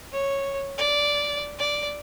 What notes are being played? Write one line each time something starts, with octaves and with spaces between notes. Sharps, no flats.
C#5
D5
D5